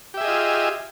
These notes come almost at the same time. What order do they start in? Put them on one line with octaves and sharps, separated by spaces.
G4 E5 G#4 D#5 F4